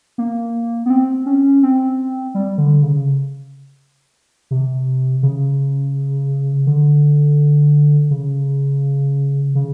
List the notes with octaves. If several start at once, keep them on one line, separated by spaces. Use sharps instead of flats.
A#3
B3
C4
C#4
C4
G3
D3
C#3
C3
C#3
D3
C#3
C#3